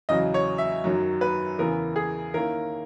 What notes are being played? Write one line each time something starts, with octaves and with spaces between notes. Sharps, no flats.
E2 C#3 F#3 D#5
C#5
E5
F#2 D#3 F#3
B4
E2 C#3 E3 B3 A#4
G#4
D#3 A#3 C#4 E4 A#4